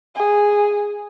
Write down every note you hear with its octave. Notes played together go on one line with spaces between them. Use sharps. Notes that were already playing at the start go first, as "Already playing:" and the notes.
G#4